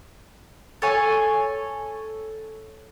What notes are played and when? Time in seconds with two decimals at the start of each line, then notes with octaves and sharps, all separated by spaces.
0.82 A4 C#5 G#5